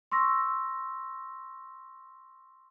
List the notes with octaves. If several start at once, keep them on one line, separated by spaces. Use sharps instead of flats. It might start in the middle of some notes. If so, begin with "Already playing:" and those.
C6 C#6 E6 A#6